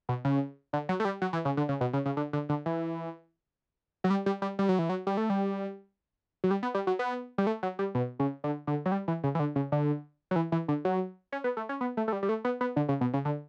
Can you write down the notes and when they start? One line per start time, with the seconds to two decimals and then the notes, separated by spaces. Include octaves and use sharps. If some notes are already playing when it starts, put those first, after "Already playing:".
0.09 B2
0.25 C#3
0.73 D3
0.89 F#3
1.00 A3
1.05 G3
1.22 F#3
1.33 E3
1.45 C#3
1.57 D3
1.69 C#3
1.81 B2
1.93 C#3
2.06 C#3
2.17 D3
2.33 D3
2.49 D3
2.66 E3
4.04 F#3
4.10 G3
4.26 G3
4.42 G3
4.59 G3
4.69 F#3
4.79 E3
4.89 F#3
5.07 G3
5.17 A3
5.30 G3
6.44 F#3
6.51 G3
6.63 B3
6.75 G3
6.87 F#3
6.99 B3
7.38 G3
7.47 A3
7.63 F#3
7.79 G3
7.95 B2
8.19 C#3
8.44 D3
8.67 D3
8.86 F#3
8.92 G3
9.08 E3
9.24 C#3
9.35 E3
9.40 D3
9.56 C#3
9.72 D3
10.31 F#3
10.36 E3
10.52 E3
10.68 D3
10.85 F#3
11.32 C#4
11.44 B3
11.57 A3
11.69 C#4
11.81 B3
11.97 A3
12.08 A3
12.13 G3
12.23 G3
12.29 A3
12.45 B3
12.61 B3
12.76 D3
12.89 C#3
13.01 B2
13.14 C#3
13.25 D3